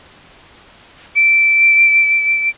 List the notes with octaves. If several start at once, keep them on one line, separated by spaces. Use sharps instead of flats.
D7